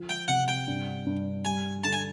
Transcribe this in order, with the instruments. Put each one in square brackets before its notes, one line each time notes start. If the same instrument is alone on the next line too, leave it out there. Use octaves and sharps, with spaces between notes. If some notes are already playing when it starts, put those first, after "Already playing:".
Already playing: [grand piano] F3
[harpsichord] G5
[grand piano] C3 [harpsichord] F#5
[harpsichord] G5
[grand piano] G2
G2
[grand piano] G3 [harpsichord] G#5
[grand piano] D3 [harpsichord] A5
[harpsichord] G#5